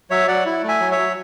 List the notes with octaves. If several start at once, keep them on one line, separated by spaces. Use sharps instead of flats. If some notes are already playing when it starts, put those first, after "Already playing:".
F#3 C#5 E5
F#3 D5 F#5
E4
A3
E5 G#5
F#3
C#5 E5
F#3